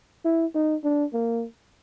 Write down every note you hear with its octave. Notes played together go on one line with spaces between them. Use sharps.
E4
D#4
D4
A#3